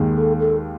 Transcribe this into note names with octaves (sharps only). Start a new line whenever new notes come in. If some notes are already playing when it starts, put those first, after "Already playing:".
Already playing: D#2 D#3 G#3
A4
A4